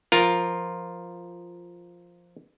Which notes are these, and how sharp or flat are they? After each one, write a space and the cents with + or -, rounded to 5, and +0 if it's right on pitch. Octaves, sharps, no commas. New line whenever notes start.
F3 +0 F4 +0 A#4 +0